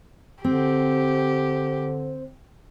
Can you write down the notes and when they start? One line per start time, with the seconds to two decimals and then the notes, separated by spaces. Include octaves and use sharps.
0.44 D3 C4 G4